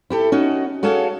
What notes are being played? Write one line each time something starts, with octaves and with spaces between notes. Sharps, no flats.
E4 G4 A4
C#4 D#4 F#4
F#4 G#4 A4 C#5 F5